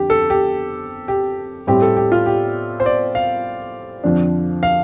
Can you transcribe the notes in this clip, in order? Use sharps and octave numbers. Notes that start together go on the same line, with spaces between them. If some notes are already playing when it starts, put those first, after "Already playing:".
Already playing: F2 D3 G4
A4
G4
G4
A2 G3 C4 G4
A4
G4
F4
G4
C5
D5
F5
F2 D3 F3 D4
F5